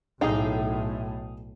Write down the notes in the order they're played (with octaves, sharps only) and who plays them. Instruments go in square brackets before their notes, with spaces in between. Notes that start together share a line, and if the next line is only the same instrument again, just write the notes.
[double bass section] B1 A2 [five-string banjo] D#4 [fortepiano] G#4 F5 G5